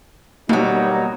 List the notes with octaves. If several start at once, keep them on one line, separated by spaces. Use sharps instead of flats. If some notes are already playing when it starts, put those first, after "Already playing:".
D#2 B2 F#3 G3 A#3 D#4